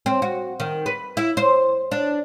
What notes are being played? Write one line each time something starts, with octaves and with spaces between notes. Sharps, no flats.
C4
F#4
D#3
B4
E4
C5
D4